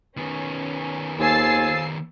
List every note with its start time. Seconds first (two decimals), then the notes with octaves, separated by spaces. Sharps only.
0.17 D#3 B3 C#4
1.19 D#2 F3 A4 G#5 E6 A6 C7